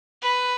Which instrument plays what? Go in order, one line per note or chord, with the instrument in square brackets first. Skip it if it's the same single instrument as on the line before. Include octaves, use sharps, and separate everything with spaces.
[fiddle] B4